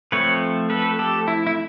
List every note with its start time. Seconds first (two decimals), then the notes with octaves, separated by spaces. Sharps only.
0.12 F3 A3 C4 B4 C#5
0.70 A4 B4
0.99 G4 A4
1.28 E4
1.47 E4